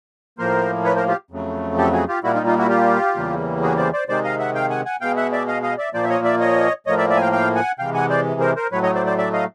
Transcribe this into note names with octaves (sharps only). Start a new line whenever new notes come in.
A2 F3 A#3 A#4 C5
B4 C#5
A#4 C5
F4 G4
F2 C#3 F#3 A3
G4 A4
F#4 G#4
F4 G4
A#2 G3 A#3 E4 F#4
D#4 F4
D#4 F4
E4 F#4
F4 G4
E2 C#3 E3 G3 A#3
F#4 G#4
C5 D5
C5 D5
C3 D#3 G#3 C5 D5
D#5 F5
E5 F#5
F5 G5
F#5 G#5
F#5 G#5
B2 G#3 F5 G5
E5 F#5
D5 E5
D#5 F5
D#5 F5
D5 E5
A#2 F3 A#3 C5 D5
E5
C#5 D#5
D5 E5
C#5 D#5
A2 F3 A#3 C#5 D#5
D5 E5
D5 E5
G#5
F5 G5
F5 G5
F#5 G#5
C3 E3 G#3 F5 G5
F#5 G#5
C5 D5
A#4 C5
A#4 C5
A2 F#3 A3 B4 C#5
C#5 D#5
C5 D5
C5 D5
D5 E5
D#5 F5